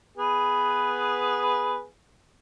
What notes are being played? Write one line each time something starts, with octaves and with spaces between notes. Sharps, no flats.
B3 G#4 B4